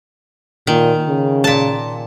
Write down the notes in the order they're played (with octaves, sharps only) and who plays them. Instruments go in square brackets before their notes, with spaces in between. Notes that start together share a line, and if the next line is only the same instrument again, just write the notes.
[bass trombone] A#2 [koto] D#3
[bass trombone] C#3
[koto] A#2 A5